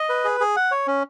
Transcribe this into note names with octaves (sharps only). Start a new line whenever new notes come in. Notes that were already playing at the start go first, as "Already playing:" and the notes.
Already playing: D#5
B4
G#4
G#4
F#5
C#5
C#4